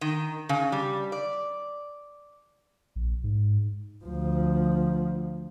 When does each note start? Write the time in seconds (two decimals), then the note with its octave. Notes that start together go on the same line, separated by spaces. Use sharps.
0.01 D#3
0.49 C#3
0.72 G3
1.12 D5
2.96 A#1
3.24 G#2
4.05 D2 F3